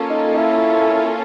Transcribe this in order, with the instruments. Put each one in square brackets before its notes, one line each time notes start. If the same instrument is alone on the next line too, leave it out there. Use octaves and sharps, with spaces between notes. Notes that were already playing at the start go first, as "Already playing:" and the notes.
Already playing: [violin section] A#3 C#4 F4 A4
[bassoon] D#4
D#4
E4